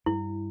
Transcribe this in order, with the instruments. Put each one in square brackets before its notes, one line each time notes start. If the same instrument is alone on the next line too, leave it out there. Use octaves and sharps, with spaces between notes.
[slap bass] G2 [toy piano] E4